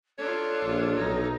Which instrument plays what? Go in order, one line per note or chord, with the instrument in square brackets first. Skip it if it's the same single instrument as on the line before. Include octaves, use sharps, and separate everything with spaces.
[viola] D4 F4 [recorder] A4 [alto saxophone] C#5
[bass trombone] A#1
[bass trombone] B1 [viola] D#4